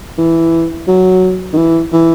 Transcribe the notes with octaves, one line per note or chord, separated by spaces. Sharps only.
E3
F#3
D#3
E3
E3